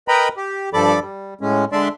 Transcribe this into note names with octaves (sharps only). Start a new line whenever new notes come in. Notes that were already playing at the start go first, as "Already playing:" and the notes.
A#4 B4 D#5 G5 A#5 B5
G4
G2 F3 A4 D5 B5 D6
G3
A2 G#3 C#4
D3 G#3 D4 D5 E5 C6